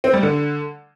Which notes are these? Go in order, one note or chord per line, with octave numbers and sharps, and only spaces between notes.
C4
G3
D3